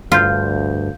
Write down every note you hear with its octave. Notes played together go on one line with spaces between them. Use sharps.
D2 G2 F4 F5 G6